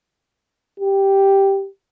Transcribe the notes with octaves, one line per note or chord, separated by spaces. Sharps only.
G4